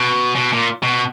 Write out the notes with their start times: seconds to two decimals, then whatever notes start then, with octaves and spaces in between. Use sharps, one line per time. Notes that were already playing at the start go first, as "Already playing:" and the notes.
Already playing: B2
0.36 B2
0.53 A#2
0.83 B2